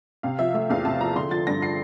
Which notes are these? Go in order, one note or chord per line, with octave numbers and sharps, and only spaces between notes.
C3 F5
F3 E5
A3 E5
E2 F5
C3 A5
F3 A#5
D3 C6
F3 A6
G2 A#6
C7